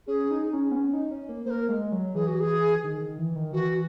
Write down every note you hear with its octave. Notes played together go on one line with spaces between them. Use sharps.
C#4 G#4
D#4
C#4
B3
C#4
D#4
C#4
A#3
A#3 A#4 C5
G#3
F#3
E3 G#4
F#4
G#4
D#3
D#3
E3
D#3
E3 F#4